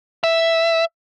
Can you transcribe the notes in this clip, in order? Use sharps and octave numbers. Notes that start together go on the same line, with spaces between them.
E5